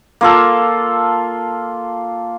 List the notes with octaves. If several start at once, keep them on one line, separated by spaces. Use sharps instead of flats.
A#3 F4 A4